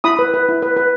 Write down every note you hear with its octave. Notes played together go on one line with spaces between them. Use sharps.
E4 B5 D#6
B4
B4
E4
B4
B4